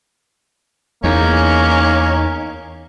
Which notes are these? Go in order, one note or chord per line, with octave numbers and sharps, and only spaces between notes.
E2 A#3 C#4 D#4